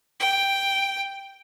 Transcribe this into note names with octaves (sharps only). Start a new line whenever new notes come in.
G5